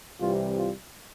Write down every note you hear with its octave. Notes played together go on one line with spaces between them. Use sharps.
C2 C3 E3 G3 F4
F4